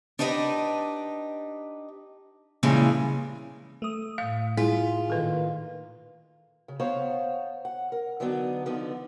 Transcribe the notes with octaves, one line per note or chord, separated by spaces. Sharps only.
D4 D#4 G4 B4 D#5
A#2 C#3 E3 F3 G3 G#3
A3 D#6
A2 F5
E4 F4 G#4
A#2 D#3 A4 B4
C#3
B3 C5 C#5 F5 A#5
F#5
A#4
D3 F#3 G3 B3 D4 D#4
D3 F3 B3 D#4